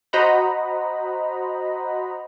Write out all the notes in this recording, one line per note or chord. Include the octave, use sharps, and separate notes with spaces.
F#4 C5 D#5 F#5 A#5 B5